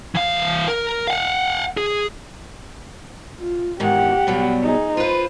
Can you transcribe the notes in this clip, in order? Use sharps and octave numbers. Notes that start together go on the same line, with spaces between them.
E3 F5
A#4
F5 F#5
G#4
F4
E2 G#2 D#3 G4 F#5
B2 F#3 G3
D#4 G#4
F4 B4 C5